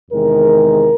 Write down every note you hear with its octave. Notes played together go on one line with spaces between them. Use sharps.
E2 C3 D#3 G#3 A#4